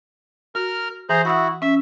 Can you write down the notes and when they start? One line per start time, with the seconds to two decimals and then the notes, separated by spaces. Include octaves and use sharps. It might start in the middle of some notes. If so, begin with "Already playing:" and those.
0.55 F#4 A#4 F6
1.09 E3 G#4 C5 A#5
1.25 E4 F#4 F#5 D#6 E6
1.62 C#4 E5 E6